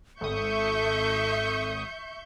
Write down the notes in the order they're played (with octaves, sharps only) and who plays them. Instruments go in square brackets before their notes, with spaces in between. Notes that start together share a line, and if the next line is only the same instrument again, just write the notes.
[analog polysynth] G#1 D#6 [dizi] A4 [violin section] E5 C#6 G6